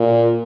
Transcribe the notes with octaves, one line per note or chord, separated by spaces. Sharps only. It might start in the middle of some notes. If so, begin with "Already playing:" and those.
Already playing: A#2